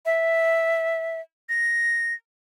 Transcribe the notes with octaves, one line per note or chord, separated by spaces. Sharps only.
E5
A#6